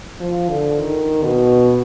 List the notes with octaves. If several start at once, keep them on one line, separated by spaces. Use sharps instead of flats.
F3
D3
D#3
B2